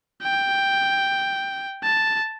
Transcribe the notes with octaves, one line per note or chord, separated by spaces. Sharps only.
G5
A5